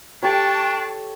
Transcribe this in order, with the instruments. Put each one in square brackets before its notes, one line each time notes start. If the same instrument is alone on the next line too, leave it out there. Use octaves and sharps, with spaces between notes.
[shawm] D4 [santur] G4 A4 C#5 [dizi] G5 [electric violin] A5 C#6